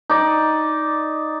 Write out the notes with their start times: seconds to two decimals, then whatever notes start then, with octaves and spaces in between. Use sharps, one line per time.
0.10 D#4 D5